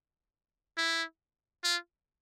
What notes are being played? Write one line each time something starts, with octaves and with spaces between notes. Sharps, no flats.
E4
F4